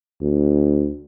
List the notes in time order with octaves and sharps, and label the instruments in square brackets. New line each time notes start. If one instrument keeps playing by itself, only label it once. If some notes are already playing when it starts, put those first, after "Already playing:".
[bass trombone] D2